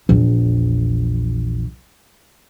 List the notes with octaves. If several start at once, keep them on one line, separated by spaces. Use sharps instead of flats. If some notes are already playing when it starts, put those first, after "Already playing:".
A#1 E2